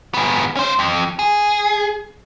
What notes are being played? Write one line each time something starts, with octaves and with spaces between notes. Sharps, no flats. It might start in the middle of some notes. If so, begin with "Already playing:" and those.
G#2 B3
C#4 C5
F2
G#4